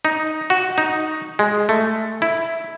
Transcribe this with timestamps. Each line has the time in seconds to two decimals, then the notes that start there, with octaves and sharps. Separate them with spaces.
0.05 D#4
0.50 F#4
0.78 D#4
1.39 G#3
1.69 A3
2.22 E4